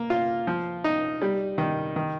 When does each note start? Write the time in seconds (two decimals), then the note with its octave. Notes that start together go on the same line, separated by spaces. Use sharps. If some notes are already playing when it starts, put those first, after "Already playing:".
Already playing: A#3
0.10 F4
0.47 F3
0.84 D#4
1.22 G3
1.58 D#3
1.96 D#3